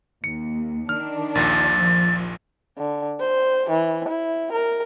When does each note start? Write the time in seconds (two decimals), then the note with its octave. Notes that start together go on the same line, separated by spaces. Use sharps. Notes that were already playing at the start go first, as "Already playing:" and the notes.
0.24 D#2 C#7
0.89 D#3 D4 F6
1.35 A#1 D#2 A#2 A6
1.74 F3
2.78 D3
3.20 C5
3.70 E3
4.09 E4
4.52 A#4